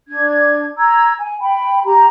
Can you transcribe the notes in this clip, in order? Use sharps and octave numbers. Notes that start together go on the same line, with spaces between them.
D4 G#6
A#5 E6 G#6
G#5
G5 B5
G4 A#5